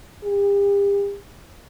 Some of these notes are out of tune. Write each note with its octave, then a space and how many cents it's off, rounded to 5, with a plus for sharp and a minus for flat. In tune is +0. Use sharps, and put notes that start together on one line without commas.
G4 +40